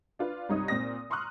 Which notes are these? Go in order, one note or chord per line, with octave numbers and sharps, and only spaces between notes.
D4 F4 B4
C2 G2 D#4 C#5 D#6
A#2 C4 D#6 A#6
A#5 C6 C#6 D#6 F6 F#6